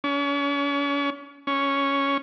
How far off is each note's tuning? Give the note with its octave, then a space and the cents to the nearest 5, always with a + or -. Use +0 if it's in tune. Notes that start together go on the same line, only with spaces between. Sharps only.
C#4 +40
C#4 +5